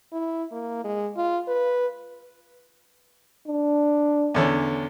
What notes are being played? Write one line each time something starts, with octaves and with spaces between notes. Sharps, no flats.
E4
A#3
G#3
F4
B4
D4
E2 D3 C#4